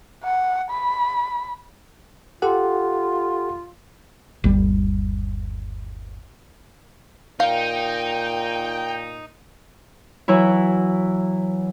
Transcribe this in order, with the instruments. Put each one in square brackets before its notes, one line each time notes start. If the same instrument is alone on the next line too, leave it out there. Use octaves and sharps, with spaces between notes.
[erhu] F#5
B5
[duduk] F4 [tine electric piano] G4 A4 F#5
[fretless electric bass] G1 D#2 G3
[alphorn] A#2 [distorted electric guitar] D#4 [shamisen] F5 [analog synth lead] G5
[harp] E3 F#3 E4